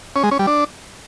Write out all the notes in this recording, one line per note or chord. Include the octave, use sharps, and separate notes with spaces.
C#4
G#3
C#4
G3
D4